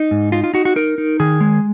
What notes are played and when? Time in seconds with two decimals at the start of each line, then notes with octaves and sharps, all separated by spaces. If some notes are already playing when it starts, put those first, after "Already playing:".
Already playing: D#4
0.11 G#2
0.32 D#4 F4
0.44 F4
0.54 D#4 F#4
0.65 F#4
0.76 D#4 A#4
0.98 D#4
1.20 D#3 G#4
1.41 G#3